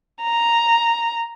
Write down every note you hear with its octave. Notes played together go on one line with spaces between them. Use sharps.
A#5